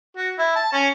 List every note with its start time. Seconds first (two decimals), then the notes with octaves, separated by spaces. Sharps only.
0.17 F#4
0.38 E4
0.56 A5
0.73 C#4